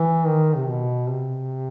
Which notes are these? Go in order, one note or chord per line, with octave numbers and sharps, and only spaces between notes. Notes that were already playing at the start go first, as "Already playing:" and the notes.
Already playing: E3
D#3
C3
B2
C3